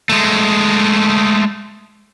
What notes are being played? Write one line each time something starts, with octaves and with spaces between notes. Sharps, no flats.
G#3 A3